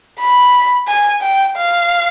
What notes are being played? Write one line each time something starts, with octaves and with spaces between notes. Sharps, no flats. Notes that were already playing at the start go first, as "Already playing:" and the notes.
B5
G#5
G5
F5